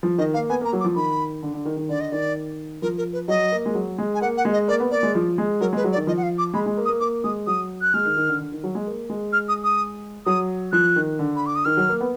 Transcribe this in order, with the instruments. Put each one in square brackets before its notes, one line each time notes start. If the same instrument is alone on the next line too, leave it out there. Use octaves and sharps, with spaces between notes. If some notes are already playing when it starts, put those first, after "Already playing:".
[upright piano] F3
[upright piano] D#3 [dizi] D#5
[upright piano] A#3 [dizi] F5
[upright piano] B3 [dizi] G#5
[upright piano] A#3 [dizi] A#5
[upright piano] F#3
[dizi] D6
[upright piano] F3
[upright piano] D#3 [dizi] B5
[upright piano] D3
D3
D#3
D#3
[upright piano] D3 [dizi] D5
[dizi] D#5
[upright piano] D#3 [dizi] D5
[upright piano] F3 [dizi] A#4
[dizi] A#4
B4
[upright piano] F#3 [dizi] D#5
[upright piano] A#3
G#3
F#3
G#3
[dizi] G#5
[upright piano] A#3 [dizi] F#5
[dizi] F#5
[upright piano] G#3
[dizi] D#5
[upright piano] A#3 [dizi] D5
[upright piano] B3
[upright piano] A#3 [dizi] D5
[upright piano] G#3
F3
G#3
[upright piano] F#3 [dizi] A#4
[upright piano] G#3 [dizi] B4
[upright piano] F#3
[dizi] D5
[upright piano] D#3
[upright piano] F3 [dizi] D#5
[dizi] F#5
F5
D6
[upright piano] G#3 [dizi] B5
[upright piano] G#3
A#3
[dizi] D#6
[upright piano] A#3
[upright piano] A#3 [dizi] D6
[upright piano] G#3 [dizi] D#6
[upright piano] F#3 [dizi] D#6
[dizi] F#6
[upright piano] G#3 [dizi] F6
[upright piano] D#3
D#3
D3
D3
D#3
F#3
G#3
A#3
G#3
[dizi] F6
D#6
D#6
[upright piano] F#3 [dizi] D#6
[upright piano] F3 [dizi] F#6
[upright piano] D#3
D3
[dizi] B5
D6
D#6
[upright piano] D#3 [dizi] F6
[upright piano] F#3
A#3
B3